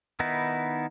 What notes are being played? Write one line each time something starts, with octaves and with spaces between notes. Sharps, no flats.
D#3 B3 D#4 E4